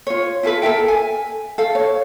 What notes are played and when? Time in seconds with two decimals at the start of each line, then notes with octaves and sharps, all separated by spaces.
0.07 F4 C#5
0.43 E4 F4 A4 B4
0.62 A4 A#4 E5 G5
0.88 G#5
1.58 A4 F5
1.75 C#5